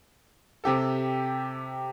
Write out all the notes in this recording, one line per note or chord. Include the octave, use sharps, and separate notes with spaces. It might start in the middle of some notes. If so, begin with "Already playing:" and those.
C3 G4 A4